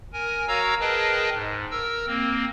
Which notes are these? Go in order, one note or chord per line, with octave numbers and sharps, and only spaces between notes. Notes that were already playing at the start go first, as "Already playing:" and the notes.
A#4 G#5
F#4 A#4 C#5 F5 A#5 E6
G#4 A#4 B4 D#5 G5 A5
G#2
A#4 E6
A#3 C4